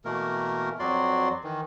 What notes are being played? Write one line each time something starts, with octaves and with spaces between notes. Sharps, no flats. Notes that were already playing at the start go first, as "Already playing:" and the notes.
B2 E3 A3 A#3 A#4
F2 F#3 F#4 D5 C6
D#3 E3